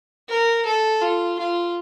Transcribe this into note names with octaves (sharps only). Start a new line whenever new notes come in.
A#4
A4
F4
F4